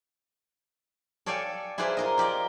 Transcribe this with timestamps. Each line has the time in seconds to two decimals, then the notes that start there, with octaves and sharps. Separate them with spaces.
1.26 A4 C#5 D5 F5 G5 G#5
1.78 E4 G#4 B4 C5 D5 F5
1.97 F4 A#4 D#5
2.18 F4 G4 D5 D#5